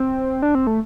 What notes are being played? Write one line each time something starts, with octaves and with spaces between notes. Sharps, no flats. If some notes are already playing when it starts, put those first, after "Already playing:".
Already playing: C4
D4
C4
A3